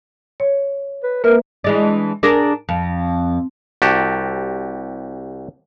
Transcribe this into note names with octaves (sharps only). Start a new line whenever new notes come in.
C#5
B4
A#3 A#4 B4 E5
E3 G#3 D4
D4 G#4 A#4
F2
C2 F#4 G4 A5